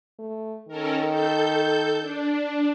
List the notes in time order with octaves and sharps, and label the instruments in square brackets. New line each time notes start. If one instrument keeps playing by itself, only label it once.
[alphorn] A3
[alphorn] D#3 [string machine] C#4 A4 A#4
[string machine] A4 G6
D4